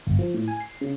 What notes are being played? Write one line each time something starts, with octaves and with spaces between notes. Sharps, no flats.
G1
F3
A2
G#5
C7
C#3